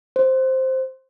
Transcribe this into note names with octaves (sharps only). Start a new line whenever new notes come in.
C5